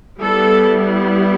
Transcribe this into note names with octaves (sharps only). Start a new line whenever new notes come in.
G3 B3 E4 A4